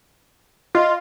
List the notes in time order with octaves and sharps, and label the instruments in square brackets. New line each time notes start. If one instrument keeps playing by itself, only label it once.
[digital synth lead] F4 [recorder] D#5